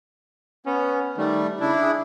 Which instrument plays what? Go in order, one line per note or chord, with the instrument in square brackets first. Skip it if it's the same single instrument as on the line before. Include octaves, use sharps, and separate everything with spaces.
[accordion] B3 [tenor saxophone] C#4
[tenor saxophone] D#3 [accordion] G3 A3
[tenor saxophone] C#3 [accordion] D4 E4
[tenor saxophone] G#4